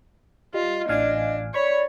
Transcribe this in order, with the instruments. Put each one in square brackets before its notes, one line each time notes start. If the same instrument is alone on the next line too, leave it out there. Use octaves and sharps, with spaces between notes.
[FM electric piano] G3 [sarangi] F4 [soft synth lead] D#5
[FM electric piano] A1 F5 G#5 [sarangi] D4
[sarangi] C#5 [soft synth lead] D5 [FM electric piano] B5 C#6